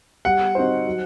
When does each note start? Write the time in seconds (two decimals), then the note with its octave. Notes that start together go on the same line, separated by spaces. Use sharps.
0.25 G3 F#5
0.55 C4 D#4 F#4 C5
0.87 F#3